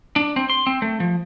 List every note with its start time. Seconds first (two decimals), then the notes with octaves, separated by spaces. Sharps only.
0.16 D4
0.36 C4
0.50 C6
0.67 C4
0.82 A3
1.00 F3